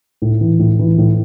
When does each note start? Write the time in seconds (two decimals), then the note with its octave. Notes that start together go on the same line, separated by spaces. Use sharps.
0.22 A2
0.41 E3
0.59 A2
0.79 E3
0.98 A2